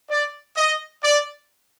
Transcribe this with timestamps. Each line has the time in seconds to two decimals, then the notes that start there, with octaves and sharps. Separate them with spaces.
0.10 D5
0.57 D#5
1.04 D5